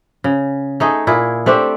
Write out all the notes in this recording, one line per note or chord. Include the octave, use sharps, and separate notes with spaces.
C#3
A3 D#4 G#4
A#2 E4 G#4
A3 C4 D4 G4